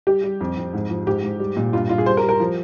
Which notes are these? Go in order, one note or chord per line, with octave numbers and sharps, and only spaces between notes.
G3 G4
G3
F2
F2
G#2
F3
G#2 G4
G#2
G3
A#2
G2 F4
G2 F4
G#4
G3 C5
A#4
G3
A#4
F3